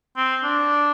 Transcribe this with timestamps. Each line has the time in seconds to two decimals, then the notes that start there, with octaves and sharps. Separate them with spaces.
0.17 C4
0.44 D4